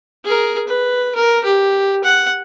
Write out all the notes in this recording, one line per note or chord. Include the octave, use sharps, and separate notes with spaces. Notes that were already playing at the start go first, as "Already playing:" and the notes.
G#4 A#4
B4
A#4
G4
F#5